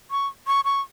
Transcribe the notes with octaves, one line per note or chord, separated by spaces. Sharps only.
C#6
C#6
C#6